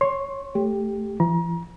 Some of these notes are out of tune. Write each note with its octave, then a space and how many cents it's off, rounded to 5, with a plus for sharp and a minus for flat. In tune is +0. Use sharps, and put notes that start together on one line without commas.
C#5 +0 C6 +15
A3 +0 G4 +10
E3 +45 A#5 +35